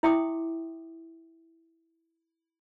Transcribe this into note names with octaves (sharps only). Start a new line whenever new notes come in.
E4 E5 G5 C6 D6 D#6